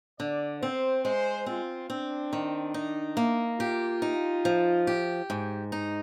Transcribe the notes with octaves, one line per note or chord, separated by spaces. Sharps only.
D3 D5
C4 C5
G#3 C5
C4 F4
C4 D4
D#3
D#4
A#3
F4 G4
D#4
F3
G4
G#2
D#4